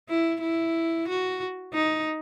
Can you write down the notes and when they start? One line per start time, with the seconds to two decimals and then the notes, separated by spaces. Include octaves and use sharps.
0.09 E4
0.41 E4
1.08 F#4
1.73 D#4